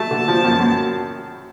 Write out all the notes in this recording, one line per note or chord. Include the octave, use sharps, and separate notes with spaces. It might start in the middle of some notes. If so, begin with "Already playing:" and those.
Already playing: F#3 A3 A5
D3
F3
F#2
F#2